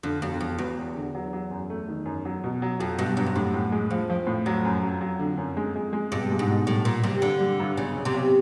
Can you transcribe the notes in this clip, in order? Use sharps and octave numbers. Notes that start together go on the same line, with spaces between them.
F2 D3
E1 F2
E1 F2
E1 E2
E1
D3
F#3
F#3
F#2
A3
D#3
F#2
F#3
B2
F#3
F2 F#3
G2 B2
G2 F#3
F2
F#2 A2
A2
G#3
F2 F3
F3
A2
F2 F#3
F#2
F#3
F#3
D3
F#2
G#3
G#3
G#3
G2 B2
G#3
G#2
B2
A2 G3
A#2 A#3
C3 G3
G2 D3
G3
G2
B1 C#3
B1
C3
B1